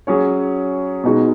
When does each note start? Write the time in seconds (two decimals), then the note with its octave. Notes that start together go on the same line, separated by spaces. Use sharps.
0.07 F#3 C#4 G#4 C#5
1.04 B2 G#3 D#4 F#4